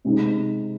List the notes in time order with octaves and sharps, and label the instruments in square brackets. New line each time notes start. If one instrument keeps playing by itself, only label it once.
[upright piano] C3 G#3 C4 D#4